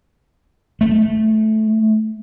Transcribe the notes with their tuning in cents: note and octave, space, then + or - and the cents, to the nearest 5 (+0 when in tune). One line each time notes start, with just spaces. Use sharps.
A3 -15